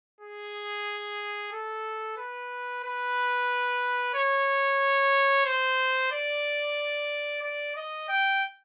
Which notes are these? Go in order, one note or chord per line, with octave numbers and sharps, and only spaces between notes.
G#4
A4
B4
B4
C#5
C5
D5
D5
D#5
G5